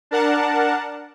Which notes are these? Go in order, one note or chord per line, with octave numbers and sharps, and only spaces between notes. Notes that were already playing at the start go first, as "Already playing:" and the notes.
D4 A#4 F#5 A5